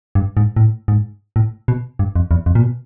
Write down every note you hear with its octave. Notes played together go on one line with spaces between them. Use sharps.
G2
G#2
A2
G#2
A2
B2
G2
F2
E2
F2
A#2
B2